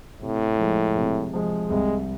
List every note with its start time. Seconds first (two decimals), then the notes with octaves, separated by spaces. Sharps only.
0.21 A2 C3
0.59 F3 G#3
0.96 C3
1.33 F3 G#3
1.70 C2 G#3